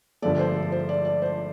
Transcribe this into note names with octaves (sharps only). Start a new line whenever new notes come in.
G1 G2 D3 F3 A3 D5
C5
A4
C5
D5
D5
C5